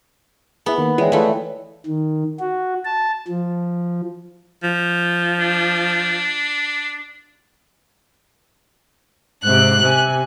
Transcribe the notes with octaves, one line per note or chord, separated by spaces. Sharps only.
B3 E4 G#4
D#3 A#3
E3 G#3 E4 C#5 D5 G5
E3 A3 E4 F4 B4
D#3
F#4
A5
F3
F3
D4
G#2 C3 F#6
C3 G#5